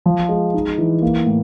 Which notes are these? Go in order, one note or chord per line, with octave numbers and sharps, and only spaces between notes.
F3
G#3
D#4
E3
A#3
A2